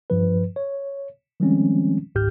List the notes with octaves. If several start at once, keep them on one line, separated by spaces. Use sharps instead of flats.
G2 F3 B4
C#5
D#3 F3 G3 G#3 C4 C#4
G#1 C#2 G#2 G4 F6 G6